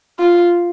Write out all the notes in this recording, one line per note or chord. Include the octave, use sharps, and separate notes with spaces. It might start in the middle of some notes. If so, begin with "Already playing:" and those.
F4